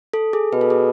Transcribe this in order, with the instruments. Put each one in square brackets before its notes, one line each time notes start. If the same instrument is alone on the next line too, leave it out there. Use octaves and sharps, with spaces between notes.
[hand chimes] A4
G#4
[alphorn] B2 [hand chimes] B4
[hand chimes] A4
G#4